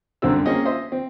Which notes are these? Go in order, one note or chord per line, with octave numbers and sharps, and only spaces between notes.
C2 F#2 D3 C4 E6
A#3 C4 C#4 G#4 D#5
C5 D#5 E5 C6
C4